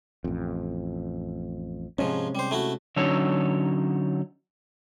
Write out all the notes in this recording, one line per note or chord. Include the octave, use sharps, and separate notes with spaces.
A1 F2
G#2 C3 F3 G#3 C#4
G3 C5
A3 E4 F#4
D3 F#3 C#4 D#4 A4 C#5